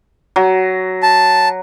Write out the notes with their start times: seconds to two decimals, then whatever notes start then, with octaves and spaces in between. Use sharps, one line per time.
0.36 F#3
1.03 A5